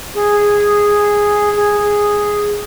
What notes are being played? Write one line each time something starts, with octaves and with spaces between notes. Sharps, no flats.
G#4
G#4